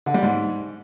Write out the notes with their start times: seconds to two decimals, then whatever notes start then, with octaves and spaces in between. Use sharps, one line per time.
0.06 D3
0.14 G3
0.22 G#2